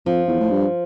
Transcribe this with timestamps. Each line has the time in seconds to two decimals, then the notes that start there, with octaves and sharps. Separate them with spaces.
0.06 F2 F3
0.28 E2
0.40 A2
0.50 G2